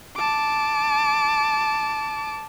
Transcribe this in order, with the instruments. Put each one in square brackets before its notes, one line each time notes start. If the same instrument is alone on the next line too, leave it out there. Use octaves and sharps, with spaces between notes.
[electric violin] A5 D6